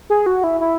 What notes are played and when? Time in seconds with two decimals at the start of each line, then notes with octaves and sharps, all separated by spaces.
0.10 G#4
0.26 F#4
0.44 E4
0.60 E4